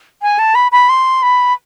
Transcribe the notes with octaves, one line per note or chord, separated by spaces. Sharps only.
G#5
A5
B5
B5
C6
B5